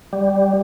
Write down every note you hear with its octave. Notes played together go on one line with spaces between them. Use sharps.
G3